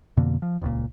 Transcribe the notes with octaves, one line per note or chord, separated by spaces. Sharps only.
F2 B2 D3 A#3
F3
D#1 C#2 A#2